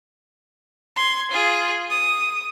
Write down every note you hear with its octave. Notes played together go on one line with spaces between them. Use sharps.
C6 G#6
F4 G#4
D#6